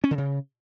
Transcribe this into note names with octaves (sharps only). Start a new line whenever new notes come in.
C#4
D3
C#3